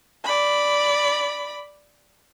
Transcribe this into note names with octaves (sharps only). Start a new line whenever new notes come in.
D5 B5